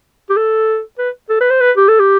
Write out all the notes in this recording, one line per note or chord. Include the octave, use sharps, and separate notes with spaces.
G4
A4
B4
A4
B4
C5
B4
G4
A4
G4